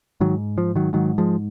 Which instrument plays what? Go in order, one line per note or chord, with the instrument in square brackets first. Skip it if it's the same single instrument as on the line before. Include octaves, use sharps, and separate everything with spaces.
[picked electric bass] G#2 D#3 F#3
F3
D#3 F#3
G#2 D#3 F#3
F3 G#3